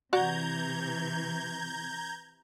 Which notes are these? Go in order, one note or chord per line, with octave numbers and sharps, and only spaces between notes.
C3 E3 F#4 D5 F#5 A#5 G6 G#6